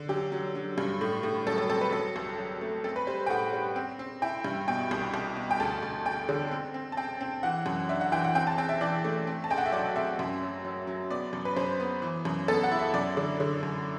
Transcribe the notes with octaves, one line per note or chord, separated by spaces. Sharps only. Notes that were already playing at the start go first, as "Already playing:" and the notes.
Already playing: D3
F#3 G4
F#3
F#3
G2
A2
A2
F#3 A4
A4
C4 A4
B4
F#3 A4
C2
F#3
A3
C4 A4
B4
G3 C5
G5
A2 F#5
G3
C4
C4
E4 G5
G2
B2 G5
C2
C2
B2
G5
D2 A5
D2
D2 G5
D3
C4
C4
A5
C4 G5
C4
E3 F#5
F#2
D4 E5
F#5
E3 G5
F#5
C4 G5
A5
C4 G5
E5
E3 D5
A3
C4
A5
A1 G5
F#5
E5
F#3 D5
C4 E5
F#2
F#3
F#3
F#3
B3 D5
F#2
B4
F#2 C5
B3
E3
F#2
B3 A4
F#5
E4
E5
F#2 D5
D3
D3
F#2